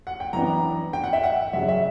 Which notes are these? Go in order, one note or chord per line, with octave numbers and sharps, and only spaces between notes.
F#5
G5
F#2 E3 B3 D4 A#5
G5
F#5
E5
F#5
F#2 C#3 F#3 E5
E5